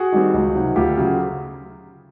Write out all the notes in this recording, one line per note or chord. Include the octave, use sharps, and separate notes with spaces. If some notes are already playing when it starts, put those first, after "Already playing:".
Already playing: F#4 G#4
D#3 G3 C4
C#2
C3 D#3 F#3
D2 F4 G4
C#3 F#3